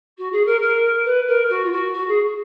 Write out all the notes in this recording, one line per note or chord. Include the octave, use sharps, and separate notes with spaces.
F#4
G#4
A#4
A#4
B4
A#4
F#4
F4
F#4
F#4
G#4